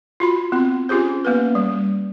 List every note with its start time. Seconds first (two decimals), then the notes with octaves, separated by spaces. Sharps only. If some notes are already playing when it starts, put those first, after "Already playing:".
0.20 F4 F#4 B5
0.52 B3 C4 F4
0.89 C#4 F4 G4 G#4 C5
1.25 A#3 B3 C#4 B4
1.55 G3